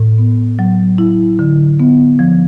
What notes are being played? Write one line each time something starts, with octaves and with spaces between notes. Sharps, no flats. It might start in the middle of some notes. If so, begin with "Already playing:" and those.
Already playing: A2
B3
F#3
E4
D3
B3
F3